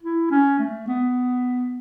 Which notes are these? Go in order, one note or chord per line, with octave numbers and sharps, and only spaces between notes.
E4
C#4
A3
B3